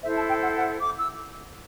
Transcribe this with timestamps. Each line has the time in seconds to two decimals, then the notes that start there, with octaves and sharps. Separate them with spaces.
0.02 E4 A4 C5 E5
0.15 A5
0.28 G5
0.42 F#5
0.55 F#5
0.82 D6
0.98 E6